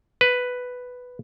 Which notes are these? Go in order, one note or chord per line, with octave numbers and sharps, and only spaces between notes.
B4